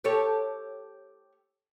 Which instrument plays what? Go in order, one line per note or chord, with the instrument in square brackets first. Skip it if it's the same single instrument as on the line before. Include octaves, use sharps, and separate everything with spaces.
[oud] G4 A4 C#5